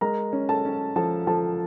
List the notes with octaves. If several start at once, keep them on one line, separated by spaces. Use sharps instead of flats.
G#3 A#4 A#5
C#4
A4 A5
C#4
F3 A4 A5
F3 A4 A5